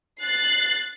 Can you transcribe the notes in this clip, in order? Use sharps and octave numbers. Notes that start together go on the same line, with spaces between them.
F#6 A6 C7